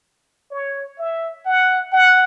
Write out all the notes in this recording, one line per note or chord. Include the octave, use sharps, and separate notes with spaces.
C#5
E5
F#5
F#5